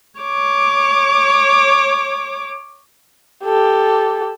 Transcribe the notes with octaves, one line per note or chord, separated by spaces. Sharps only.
C#5 D6
G4 A4